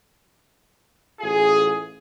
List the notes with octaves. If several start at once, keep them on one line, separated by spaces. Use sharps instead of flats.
A1 F4 G#4